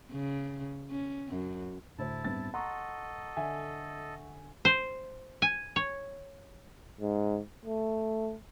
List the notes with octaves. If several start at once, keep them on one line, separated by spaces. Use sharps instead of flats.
C#3
C#4
F#2
D2 A2 E4 C5 A5
G2 B3 C4 A6
A4 D#5 F#5 A#5 C6 C#6
D3 E5 G#5
C5
G#5
C#5
G#2
A3